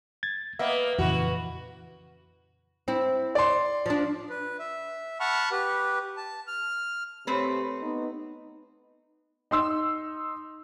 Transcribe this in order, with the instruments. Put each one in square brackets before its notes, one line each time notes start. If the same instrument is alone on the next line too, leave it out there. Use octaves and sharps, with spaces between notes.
[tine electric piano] G#6 A6
[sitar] A#3 B3 [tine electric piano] D#5 E5
[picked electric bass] F2 A#2 C#3 [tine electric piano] E3 [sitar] F#4 B4
[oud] C4 E4
[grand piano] D5 C6
[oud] F3 D4
[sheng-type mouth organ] B4
E5
F#5 A5 B5 C#6 F6
G4 B4
A5
F6
[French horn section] C3 G4 C#5 [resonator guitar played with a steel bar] A3 C4 B4
[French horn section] B3 D#4
[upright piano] D#4 C6 E6